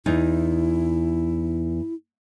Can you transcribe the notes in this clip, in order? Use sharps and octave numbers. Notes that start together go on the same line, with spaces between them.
E2 D#4 E4